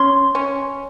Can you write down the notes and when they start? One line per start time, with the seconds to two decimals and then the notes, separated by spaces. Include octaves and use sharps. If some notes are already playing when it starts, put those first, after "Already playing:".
Already playing: C#4 C6
0.35 C#4